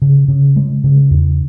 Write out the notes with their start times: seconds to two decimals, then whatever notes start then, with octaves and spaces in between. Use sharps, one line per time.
0.02 C#3
0.28 C#3
0.56 G#3
0.84 C#3
1.11 E2